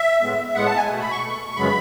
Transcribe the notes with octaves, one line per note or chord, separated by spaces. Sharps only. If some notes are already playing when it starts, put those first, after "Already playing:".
Already playing: E5
A2 G#3 B3
A2 G#3 B3 F#5
A5
G#5
B2 A3
B5
C#6
B2 A3
F#2 C#3 G#3 B3 B5